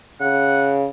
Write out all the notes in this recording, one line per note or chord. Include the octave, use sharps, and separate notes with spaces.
C#3 F#5